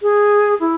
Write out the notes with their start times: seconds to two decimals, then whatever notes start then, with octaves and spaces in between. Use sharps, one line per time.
0.02 G#4
0.60 E4